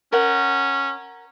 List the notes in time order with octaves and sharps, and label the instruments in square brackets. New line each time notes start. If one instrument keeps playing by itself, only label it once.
[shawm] C#4 [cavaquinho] A#4 F#5